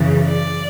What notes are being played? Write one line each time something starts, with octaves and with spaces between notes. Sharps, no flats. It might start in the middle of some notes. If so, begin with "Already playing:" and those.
Already playing: F#2 C#3 E3
D5